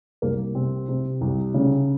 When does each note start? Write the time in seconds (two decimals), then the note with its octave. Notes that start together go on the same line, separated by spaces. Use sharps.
0.22 C2 A#3
0.55 C3 C4
0.89 C3
1.21 C2
1.54 C#3